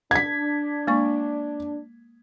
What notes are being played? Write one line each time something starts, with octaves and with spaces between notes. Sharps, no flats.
D4 G#6 B6
G#3 A#3 C#6